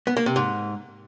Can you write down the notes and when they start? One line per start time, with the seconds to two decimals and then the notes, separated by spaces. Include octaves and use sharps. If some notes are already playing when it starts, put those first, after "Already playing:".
0.07 B3
0.17 A#3
0.26 C3
0.36 G#2